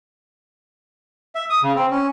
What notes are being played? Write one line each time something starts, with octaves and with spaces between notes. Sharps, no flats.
E5
D#6
C#3
C4
C#4